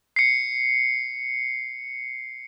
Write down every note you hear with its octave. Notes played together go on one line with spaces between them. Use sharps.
C7 C#7